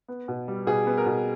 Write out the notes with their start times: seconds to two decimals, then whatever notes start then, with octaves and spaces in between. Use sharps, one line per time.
0.08 B3
0.28 B2
0.48 G3
0.67 B2 G#4
0.87 B3
0.97 A#4
1.06 B2